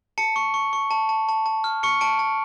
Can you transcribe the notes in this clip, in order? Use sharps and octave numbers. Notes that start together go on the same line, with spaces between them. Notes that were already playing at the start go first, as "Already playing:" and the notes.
A5 C#7
C#6
C#6
C#6
A5
A5
A5
A5
F6
C#6 C#7
A5 D7
A5